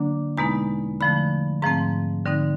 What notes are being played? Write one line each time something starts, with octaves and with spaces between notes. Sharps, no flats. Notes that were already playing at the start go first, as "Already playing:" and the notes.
Already playing: D3 F#3 A#3 D4
E2 B2 G#3 B3 D#4 A#5
D3 F3 A3 B5
G#2 F3 A3 C4 A#5
D3 G3 C4 D#4